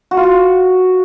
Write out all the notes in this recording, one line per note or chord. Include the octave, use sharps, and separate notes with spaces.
F#4
F4
F#4